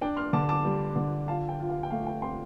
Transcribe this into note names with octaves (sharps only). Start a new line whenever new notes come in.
D4 G5
C6 F6
D3 A5 D6
A5 D6
G3
D3
F4 F5 A5
G5
F4
F5
G5
A3 F5
G5
C4 G5 C6